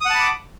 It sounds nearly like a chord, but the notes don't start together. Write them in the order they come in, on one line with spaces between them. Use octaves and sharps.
D#6 F#5 A5 B5 D6